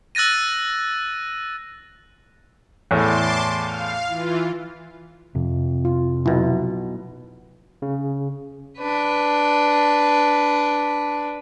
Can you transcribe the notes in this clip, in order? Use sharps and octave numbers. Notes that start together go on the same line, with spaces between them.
E6 F#6 A6 A#6 D#7
E2 A2 A5 C6 D6
F5
E3 F4
F2 C3
F4
B1 B2 E4 F4 B4
C#3
D4 B4